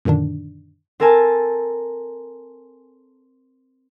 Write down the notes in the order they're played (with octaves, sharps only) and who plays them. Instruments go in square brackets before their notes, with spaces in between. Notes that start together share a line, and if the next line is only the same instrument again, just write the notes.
[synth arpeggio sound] F#2 A#2 D3 D#3 D4
[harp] C4 A4 A#4 G#5 A5